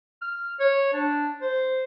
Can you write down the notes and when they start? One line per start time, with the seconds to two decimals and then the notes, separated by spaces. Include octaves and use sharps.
0.22 F6
0.60 C#5
0.93 D4
1.41 C5